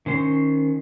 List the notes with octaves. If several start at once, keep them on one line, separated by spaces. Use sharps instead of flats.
D#3 C#4 C5 C6